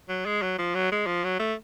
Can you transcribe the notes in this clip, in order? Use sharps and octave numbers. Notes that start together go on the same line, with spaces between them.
F#3
G#3
F#3
F3
F#3
G#3
F3
F#3
A3